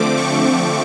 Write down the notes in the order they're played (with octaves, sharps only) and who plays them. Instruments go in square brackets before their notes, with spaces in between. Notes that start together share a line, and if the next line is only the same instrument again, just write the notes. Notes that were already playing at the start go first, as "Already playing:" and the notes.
Already playing: [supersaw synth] D3 F3 A3 C4 D6
C#6
C#6